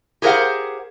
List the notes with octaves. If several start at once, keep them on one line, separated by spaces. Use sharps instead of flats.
G4 G#4 A#4 C5 F5 F#5